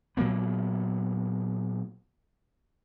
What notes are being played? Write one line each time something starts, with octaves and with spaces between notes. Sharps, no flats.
A#2 F#3 A#3 B3